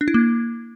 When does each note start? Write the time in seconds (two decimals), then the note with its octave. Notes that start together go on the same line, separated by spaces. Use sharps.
0.01 D4
0.08 E4
0.14 A#3